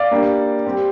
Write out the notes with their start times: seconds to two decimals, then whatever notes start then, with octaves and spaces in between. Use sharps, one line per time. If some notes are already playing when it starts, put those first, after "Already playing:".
Already playing: D5 F5
0.11 G3 A#3 D4
0.65 G3 C4 G4